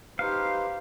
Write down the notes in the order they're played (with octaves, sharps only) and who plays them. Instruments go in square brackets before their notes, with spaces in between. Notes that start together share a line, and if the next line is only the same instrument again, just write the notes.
[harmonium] D#4 B4 C5 [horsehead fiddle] G4 [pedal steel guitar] F5